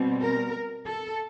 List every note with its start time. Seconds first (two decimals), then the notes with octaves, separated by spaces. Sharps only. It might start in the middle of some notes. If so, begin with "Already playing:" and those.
Already playing: B2 G3 C4
0.19 A#4
0.84 A4